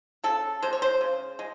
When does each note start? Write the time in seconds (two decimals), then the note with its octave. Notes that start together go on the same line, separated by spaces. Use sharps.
0.24 C#3 A4
0.62 G#3 C5
0.73 C#5
0.82 C5
1.01 C#3
1.39 G#3